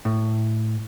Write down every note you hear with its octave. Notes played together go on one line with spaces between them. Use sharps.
A2